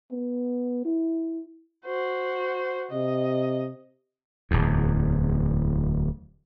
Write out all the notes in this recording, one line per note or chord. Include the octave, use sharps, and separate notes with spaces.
B3
E4
F#4 C5
C3 D#5
D1 E2